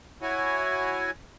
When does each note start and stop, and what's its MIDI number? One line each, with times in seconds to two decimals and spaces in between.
0.22 1.11 64
0.22 1.11 66
0.22 1.11 73
0.22 1.11 80